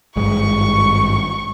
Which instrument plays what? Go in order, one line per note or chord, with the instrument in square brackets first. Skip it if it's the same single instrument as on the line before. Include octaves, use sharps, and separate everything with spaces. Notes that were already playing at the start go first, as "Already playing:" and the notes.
[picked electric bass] G#1 G2 G#3 [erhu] C#6